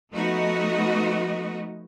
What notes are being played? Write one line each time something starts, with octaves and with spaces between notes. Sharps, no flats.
F3 A3 B3 D#4 F#4 D#5